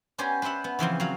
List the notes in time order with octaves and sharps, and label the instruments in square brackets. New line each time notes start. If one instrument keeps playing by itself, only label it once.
[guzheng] B3 C#4 G4 C5 D5 G#5
B4 C5 D5 E5 F#5
B3
C#3 E3 F3 C4
F#3 F#4 F5